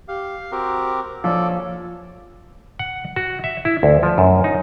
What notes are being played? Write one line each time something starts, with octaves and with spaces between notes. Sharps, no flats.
G4 F5
C4 F#4 G4 A#4
A#1 F3 A4 C#5 D5
F#5
F#4
E5
E4
D2
F3
F#2
D#4